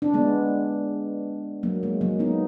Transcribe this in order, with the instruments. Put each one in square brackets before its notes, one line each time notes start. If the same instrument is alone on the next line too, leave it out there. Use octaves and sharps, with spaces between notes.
[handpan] D4
G#3 B3
F#3 A#3
G#3
F#3 A#3
B3 D#4